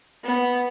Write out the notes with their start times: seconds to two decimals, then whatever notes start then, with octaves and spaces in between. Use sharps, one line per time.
0.24 B3